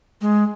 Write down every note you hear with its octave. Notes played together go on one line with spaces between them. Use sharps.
G#3